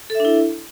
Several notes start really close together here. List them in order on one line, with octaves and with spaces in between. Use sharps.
A4 E5 D4 E4